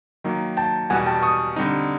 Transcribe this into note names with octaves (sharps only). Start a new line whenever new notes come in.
D#3 F#3 A#3 D#4
G5 A5
E2 B2 G3 F#5 G#5
G5 A5
C#6 D#6
D3 G3 C4 D#4